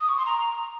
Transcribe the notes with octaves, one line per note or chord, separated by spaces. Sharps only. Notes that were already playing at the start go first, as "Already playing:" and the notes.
D#6
C#6
C6
A#5